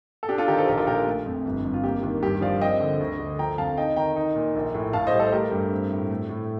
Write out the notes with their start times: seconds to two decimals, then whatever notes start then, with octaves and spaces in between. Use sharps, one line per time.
0.23 A4
0.29 D4 G4
0.38 F4 A4
0.48 D#3 G4 A#4
0.58 A4 C5
0.68 A#1 G4 A#4
0.77 F4 A4
0.87 A#2 G4 A#4
1.07 A3
1.26 F2
1.45 G1
1.64 F2
1.74 F4
1.84 A#3 G4
2.03 D#2
2.22 G2 G4
2.41 F3 D5 F5
2.61 C4 D#5 G5
2.80 D3
3.00 D2
3.20 D3
3.39 F3 G5 A#5
3.58 F2 F5 A5
3.77 D#4 D#5 G5
3.96 D#3 G5 A#5
4.16 D#4
4.36 A#2
4.55 A#1
4.74 A2
4.93 A2 F5 A5
5.07 C5 D#5
5.13 G3
5.19 A4 C5
5.32 A3 G4 A#4
5.52 G2
5.71 C4
5.91 A2
6.10 A3
6.29 A2